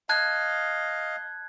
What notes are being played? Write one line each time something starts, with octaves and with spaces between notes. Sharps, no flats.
D#5 F5 A5 F#6 G#6